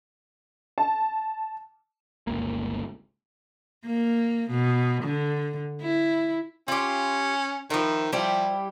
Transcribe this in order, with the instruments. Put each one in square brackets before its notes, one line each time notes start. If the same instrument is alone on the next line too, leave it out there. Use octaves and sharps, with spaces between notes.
[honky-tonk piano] A5
[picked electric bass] G1 C#2 A#3
[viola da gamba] A#3
B2
D3
E4
[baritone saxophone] C#4 [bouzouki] F4 G4
[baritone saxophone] D#3 [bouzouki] F3 E4
[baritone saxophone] F3 [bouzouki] G3 E4 G4